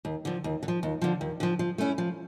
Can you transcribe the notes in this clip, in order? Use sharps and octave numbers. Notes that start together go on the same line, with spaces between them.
D#2
D3 F3
D#2
D3
F3
D#2
D3 F3
D#2
D3 F3
F3
A3 C#4 E4
F3